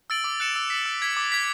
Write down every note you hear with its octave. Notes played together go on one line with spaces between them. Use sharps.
E6 A6 D7 F#7
D6
F#6 C#7 E7
E6
B6 F#7
E6
G#6 B6
D6
G#6 B6